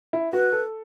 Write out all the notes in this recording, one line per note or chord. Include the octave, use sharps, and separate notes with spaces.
E4
F#4 B4
A4